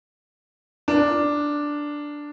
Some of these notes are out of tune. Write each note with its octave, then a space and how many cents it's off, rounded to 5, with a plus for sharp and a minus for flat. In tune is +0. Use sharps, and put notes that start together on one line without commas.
D4 +0 A#4 +0